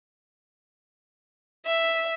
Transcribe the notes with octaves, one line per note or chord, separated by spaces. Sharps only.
E5